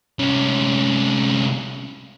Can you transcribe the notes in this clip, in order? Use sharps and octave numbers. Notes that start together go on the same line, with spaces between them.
C2 C#4